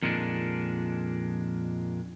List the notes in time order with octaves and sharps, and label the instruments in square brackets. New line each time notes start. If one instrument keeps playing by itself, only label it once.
[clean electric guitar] F2 A#2 D#3 G#3 C4 D4